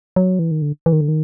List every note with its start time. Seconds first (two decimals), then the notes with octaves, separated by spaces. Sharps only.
0.16 F#3
0.39 E3
0.51 D#3
0.62 D3
0.86 E3
0.93 D#3
1.01 D3
1.08 D#3